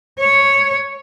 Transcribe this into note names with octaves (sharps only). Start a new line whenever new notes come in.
C#5